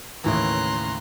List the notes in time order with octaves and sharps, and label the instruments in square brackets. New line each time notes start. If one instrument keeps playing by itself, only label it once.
[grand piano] D#2 A2 [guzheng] C#3 E3 [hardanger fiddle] A#5 [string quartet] C6 F#6